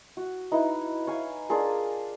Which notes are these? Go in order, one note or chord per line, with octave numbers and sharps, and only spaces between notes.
F#4
D#4 E4 B4
C#5 F5 G#5
D4 F4 G#4 A#4